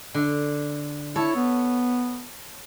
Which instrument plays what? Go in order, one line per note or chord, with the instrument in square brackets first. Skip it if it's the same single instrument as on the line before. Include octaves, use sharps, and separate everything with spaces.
[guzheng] D3
[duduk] E4 [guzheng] A4 C#5
[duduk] B3